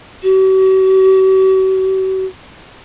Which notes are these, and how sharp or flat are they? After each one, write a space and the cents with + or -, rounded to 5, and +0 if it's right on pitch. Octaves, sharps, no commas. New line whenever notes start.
F#4 +45